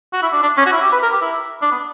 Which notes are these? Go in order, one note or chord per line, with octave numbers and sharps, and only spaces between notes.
F#4
E4
D4
D4
C#4
F#4
E4
G4
B4
A#4
G4
E4
D4
B3